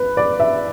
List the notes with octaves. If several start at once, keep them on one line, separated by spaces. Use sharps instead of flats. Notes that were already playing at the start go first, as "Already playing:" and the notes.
Already playing: B4
D5
E5